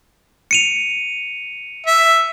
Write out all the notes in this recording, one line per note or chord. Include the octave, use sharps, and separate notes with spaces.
C#7 D#7 F7
E5